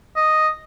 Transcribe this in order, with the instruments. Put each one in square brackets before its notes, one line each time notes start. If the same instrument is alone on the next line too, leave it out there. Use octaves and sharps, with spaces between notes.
[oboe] D#5